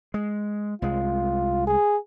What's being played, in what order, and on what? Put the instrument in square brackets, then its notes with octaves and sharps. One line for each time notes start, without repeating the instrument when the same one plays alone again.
[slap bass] G#3
[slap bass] C2 G#3 [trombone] F4
[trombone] G#4